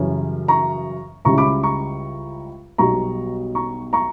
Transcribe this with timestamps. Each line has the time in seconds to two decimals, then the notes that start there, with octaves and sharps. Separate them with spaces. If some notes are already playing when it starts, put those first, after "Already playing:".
Already playing: F#2 C#3 E3 G3 C#4
0.48 A#5 C#6
1.25 C#2 C#3 G3 C#4 E4 A#5 C#6
1.38 B5 D6
1.63 A#5 C#6
2.78 B1 B2 G3 A#5 C#6
3.55 A#5 C#6
3.93 A#5 C#6